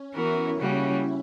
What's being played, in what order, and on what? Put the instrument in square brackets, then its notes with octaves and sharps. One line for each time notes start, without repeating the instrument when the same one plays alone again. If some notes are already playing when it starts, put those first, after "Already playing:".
Already playing: [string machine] C#4
[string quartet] E3 B3 F#4 A#4 [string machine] E4
[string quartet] C#3 G3 A#3 C#4 F#4